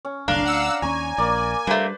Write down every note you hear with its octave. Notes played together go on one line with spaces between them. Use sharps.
C#4
F#1 C2 D3 D4 F5 A#5
D2 F5 F#5 E6
D#2 B3 C#4 G#5 A#5 C#6
A#1 A#3 D5
G3 A3 A#3 D4 B4 C5